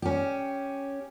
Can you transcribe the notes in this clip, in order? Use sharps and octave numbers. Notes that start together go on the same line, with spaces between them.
C#4 G4